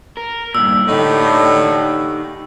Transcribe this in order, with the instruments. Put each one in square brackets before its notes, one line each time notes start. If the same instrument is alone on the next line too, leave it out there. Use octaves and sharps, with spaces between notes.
[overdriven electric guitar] A#4
[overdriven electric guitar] G2 A#2 [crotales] E6
[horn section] A2 D3 [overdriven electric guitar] D#4 G4